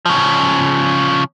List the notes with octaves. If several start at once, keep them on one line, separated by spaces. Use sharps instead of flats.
C#3 F3